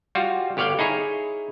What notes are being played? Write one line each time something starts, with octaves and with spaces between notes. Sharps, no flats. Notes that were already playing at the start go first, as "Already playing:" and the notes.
G3 F4 F#4
G1 G4 C#5 D5 F5 G5
D#4 E4 G#4 C#5